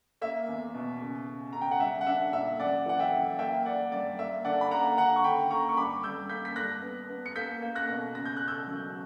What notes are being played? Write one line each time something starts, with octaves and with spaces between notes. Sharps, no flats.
A#3 E5
E2
B2
C#3
C#3
C#3 A#5
G5
F#5
G3 E5
F#5
D4 E5
A#2 E5
F#2 D5 F#5
E3 F#5
E5 G5
F#2
A#3 E5 G5
A#3 D5 F#5
G2 D5
A#3 E5
D3 D5 F#5
B5
A#3 F#5 A#5
D3 F#5 A#5
C#6
D3 G5 B5
A#3 A#5 C#6
C#6
G2 B5 D6
G2 E6 G6
A#3 G6 B6
B6
G2 F#6 A#6
B3
B3
C#7
A#3 G6 B6
A#3
F#6 A#6
B2
C#3 A#6
G6
C#3 F#6
E6 G6
F#3